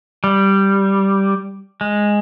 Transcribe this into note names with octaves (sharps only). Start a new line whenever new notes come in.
G3
G#3